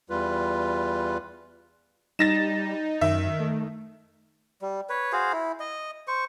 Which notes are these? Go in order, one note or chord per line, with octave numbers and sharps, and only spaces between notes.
E2 G3 F4 B4
G3 D#4 A6 A#6 E7
F#2 D#3 E5
A3
G3
B4 C#5
F#4 G#4 C5 F5
E4
D#5
C5 C#6